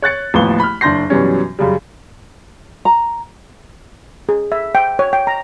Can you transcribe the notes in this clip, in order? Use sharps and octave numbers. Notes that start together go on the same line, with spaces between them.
C#5 F#6 A6 C#7
A1 D#2 F3 B3 G7
B5 F6
F#1 D4 C6 G6 A#6 C7
F#2 B2 E3 G3 C#4
F#2 C#3 G3
A#5
G#4
E5
G5
C#5
G5
A#5